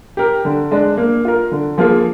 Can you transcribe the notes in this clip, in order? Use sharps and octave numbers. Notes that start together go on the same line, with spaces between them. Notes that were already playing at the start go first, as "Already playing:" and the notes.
G4 A#4
D3
G#3 D4
A#3
F4 A#4
D3
F3 A#3 F4 G#4